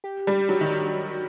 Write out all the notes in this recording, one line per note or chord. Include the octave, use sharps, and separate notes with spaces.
G4
G3
F#3
D#3